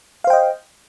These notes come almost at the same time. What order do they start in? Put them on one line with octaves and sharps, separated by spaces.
F5 C5 G5 D#5